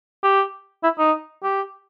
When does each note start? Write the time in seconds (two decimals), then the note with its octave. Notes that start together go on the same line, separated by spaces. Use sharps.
0.23 G4
0.83 E4
0.98 D#4
1.43 G4